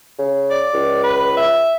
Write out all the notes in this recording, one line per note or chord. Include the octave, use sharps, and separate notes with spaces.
C#3
D5
C#2
B4
E5